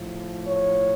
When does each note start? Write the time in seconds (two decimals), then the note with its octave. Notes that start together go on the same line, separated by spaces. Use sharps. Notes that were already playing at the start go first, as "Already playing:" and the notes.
Already playing: A2 F3
0.47 C#5